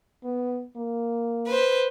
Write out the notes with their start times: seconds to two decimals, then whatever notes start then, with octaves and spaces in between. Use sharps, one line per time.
0.24 B3
0.76 A#3
1.47 B4 C5